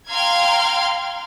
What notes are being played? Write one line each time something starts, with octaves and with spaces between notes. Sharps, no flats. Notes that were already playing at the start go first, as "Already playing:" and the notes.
F5 G5 A#5 C6 F6 G#6